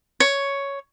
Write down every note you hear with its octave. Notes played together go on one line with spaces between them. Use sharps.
C#5